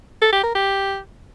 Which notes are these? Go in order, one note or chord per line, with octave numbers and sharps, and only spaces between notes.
A4
G4
A#4
G4